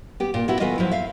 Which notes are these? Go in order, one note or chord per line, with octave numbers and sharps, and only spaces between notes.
B3 G4
A#2 F4
B3 E4 F#4
E3 A3 B3 F4 D#5
F3 F#3 E4
E5 F5